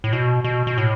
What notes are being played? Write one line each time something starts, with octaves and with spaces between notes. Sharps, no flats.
A2
B2
B2
B2
A2